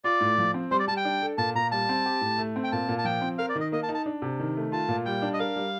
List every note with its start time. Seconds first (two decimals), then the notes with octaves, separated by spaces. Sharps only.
0.04 F4 D5
0.21 A2
0.38 F3
0.54 C4
0.71 G3 C5
0.79 D5
0.88 G3 A5
0.97 G5
1.05 D4
1.21 A4
1.38 A#2 A5
1.55 A#2 A#5
1.72 G3 A5
1.89 C4
2.06 G4
2.21 A2
2.38 A3
2.56 C4
2.64 G5
2.72 A#2 A5
2.89 A#2
2.98 A5
3.05 F3 G5
3.21 C4
3.38 A#4 F5
3.49 D5
3.55 D#3 D#5
3.72 A#3 D#5
3.83 A5
3.89 D#4
3.94 A5
4.06 D4
4.22 C3
4.40 D#3
4.56 A3
4.72 F4 A5
4.88 A#2
5.06 G3 G5
5.22 D4
5.33 D#5
5.39 A#4 F5
5.56 G3